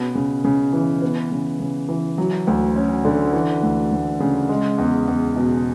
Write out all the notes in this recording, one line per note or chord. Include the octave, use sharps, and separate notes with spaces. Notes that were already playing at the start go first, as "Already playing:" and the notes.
Already playing: B2 B3 C#4
C#3
C#3
E3
B3
C#3
C#3
E3
F#3
D2
C#4
D3
E3
D2
D2
C#3
G#3
E2
E2
B2